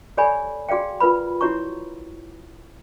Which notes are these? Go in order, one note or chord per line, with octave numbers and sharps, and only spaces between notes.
G4 A4 C#5 D5 G#5 B5
F#4 G#4 D5 F5 G5
F4 A#4 B4 B5
E4 F#4 C#5 A#5 C#6